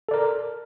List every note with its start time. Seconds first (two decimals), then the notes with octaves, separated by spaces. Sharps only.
0.09 A4
0.11 D5
0.14 A#4